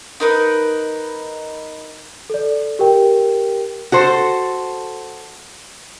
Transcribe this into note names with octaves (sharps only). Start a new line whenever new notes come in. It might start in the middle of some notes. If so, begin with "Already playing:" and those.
D#4 A#4 B4
A4 D5
G4 A#4 G5
F#4 A4 C5